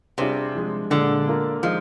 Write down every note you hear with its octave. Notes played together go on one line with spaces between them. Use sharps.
C3 G3 D4 F4 G#4 C5
F3 G#3 D4
A#2 D3 G#3 D4
A#3 F4 A#4
F3 G#3 D#4